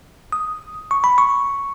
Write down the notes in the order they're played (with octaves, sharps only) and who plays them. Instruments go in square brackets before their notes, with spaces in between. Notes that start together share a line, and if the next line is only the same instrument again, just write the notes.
[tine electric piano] D#6
C#6
B5
C#6